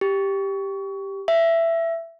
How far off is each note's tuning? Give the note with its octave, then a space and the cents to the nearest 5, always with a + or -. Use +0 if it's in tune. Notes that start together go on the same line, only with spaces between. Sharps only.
G4 +0
E5 +15